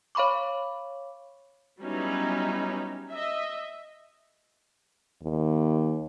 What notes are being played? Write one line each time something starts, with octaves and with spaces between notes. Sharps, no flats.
C#5 F5 B5 C#6 D6
F#3 G3 B3 C#4 D#4 E4
D#5 E5
D#2